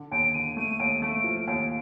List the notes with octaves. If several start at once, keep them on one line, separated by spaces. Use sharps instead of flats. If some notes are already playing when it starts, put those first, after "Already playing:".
Already playing: D3
D#2 D7
D3 D#7
A3 D#7
D#2 D7
A3
D7
F3
D7
D#2